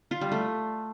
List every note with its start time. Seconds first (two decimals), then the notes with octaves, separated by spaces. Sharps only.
0.11 F4
0.21 G3
0.32 A3